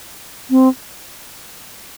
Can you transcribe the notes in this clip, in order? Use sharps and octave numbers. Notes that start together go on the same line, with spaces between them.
C4